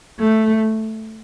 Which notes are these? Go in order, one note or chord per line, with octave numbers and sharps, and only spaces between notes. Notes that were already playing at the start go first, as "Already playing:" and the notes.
A3